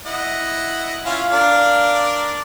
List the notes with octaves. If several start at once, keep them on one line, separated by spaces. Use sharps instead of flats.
E4 D#5 F#5
C#4 E4 F4 F5
D4 A#4 D5